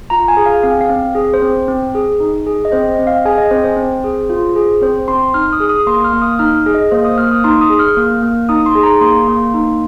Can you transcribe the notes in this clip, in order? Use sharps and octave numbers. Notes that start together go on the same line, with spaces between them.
F4 A#5
G#5
G#4
F5
C4 F5
F5
C4
G#4
C5
C4
C4
G#4
D#4
G#4
D#5
C4 C5
D#5
C4
F5
G#4 G#5
D#5
C4 C5
C5
C4
G#4
F4
G#4
C4 C5
C4 C6
D#4 F6
D#6
G#4
D#6
A#3 C6
F6
A#3
D#6
D#4 F6
G#4
D#5
A#3 C5
D#6
A#3 F6
D#6
D#4 C6
D#6
G#4
F6
A#3
A#3
D#4 D#6
C6
G#4
A#5
A#3 C6
A#3
D#4